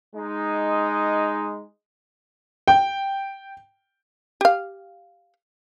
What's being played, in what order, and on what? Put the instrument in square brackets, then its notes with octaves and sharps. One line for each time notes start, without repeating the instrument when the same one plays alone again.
[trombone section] G#3 D#4
[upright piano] G5
[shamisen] G4 F5